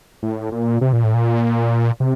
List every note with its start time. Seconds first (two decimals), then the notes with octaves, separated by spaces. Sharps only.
0.23 A2
0.52 A#2
0.81 C3
0.93 A#2
1.04 A2
1.14 A#2
2.00 C3